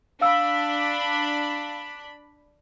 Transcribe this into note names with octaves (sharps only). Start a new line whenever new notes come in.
D4 F5 B5 E6